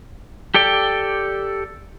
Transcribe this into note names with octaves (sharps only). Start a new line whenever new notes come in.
G4 A4 D5 G5